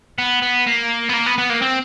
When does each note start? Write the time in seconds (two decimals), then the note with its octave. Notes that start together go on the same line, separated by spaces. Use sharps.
0.18 B3
0.42 B3
0.67 A#3
1.09 B3
1.14 A#3
1.26 B3
1.38 B3
1.50 A#3
1.62 C4